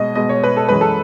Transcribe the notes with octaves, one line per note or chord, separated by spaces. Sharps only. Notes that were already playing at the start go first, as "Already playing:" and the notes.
Already playing: B2 G#3 D#5
B2 G#3 D#5
C#5
B4
A4
F#2 E3 G#3 B4
A4